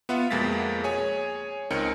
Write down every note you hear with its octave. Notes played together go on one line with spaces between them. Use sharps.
B3 F4 E5 F#5
F2 B2 G#3 A#3 A6 B6
G#4 C#5 G#5
C#2 C4 D#4 A#4 C#7